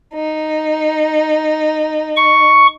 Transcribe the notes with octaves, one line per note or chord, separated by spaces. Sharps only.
D#4
C#6